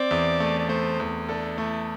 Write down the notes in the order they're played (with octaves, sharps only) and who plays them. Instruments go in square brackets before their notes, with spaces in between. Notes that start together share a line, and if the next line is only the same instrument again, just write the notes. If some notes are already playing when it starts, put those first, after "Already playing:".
Already playing: [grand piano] C4 [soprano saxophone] D5
[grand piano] E2
A3
[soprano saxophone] D5
[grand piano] A3 [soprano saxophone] C5
[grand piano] E2
[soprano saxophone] D4 [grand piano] A4
[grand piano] A3 [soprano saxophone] E4